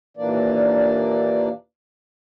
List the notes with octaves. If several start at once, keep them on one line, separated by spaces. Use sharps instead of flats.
D#2 A#2 E3 A#3 D4 D5